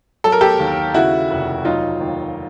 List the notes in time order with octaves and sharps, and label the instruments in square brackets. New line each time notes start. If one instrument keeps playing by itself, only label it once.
[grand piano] F#3 A4
A#4
G4 A4
D#2
C#3 E4 F#4
F1
F#3 D#4 F4
D#2